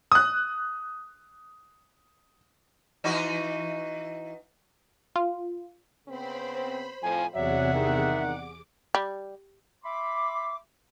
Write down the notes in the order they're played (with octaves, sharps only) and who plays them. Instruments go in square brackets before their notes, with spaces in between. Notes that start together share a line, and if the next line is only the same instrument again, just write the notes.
[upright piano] D#6 F#6
[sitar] E3 D#4 F#4
[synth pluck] F4
[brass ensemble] C#3 B3 C4 [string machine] C5 B5
[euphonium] F2 [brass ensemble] A2 F3 [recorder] G#5
[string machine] E2 C3 G#4 [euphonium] F#3 [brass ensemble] D5 F#5 [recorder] E5
[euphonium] D#3
[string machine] D6
[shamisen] G3
[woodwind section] E5 B5 C6 D6